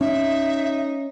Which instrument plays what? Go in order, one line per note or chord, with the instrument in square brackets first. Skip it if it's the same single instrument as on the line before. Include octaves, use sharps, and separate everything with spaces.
[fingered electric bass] C#4 [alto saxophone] D#4 [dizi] E5